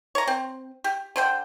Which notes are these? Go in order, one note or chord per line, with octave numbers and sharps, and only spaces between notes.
C#5 A#5
C4
G4
D3 C5 G5